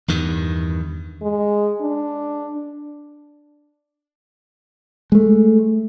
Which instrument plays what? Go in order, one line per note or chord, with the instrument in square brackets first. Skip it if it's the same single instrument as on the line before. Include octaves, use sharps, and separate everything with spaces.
[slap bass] E2 G2 D#3
[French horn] G#3
D4
[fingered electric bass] G#3 A3